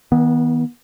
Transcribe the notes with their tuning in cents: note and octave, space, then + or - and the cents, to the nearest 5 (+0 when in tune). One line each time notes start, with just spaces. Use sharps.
D#3 +40 B3 -20